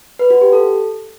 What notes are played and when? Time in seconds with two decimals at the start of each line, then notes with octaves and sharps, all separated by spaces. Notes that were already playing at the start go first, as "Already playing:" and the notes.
0.19 B4
0.30 F#4
0.41 G4
0.52 A4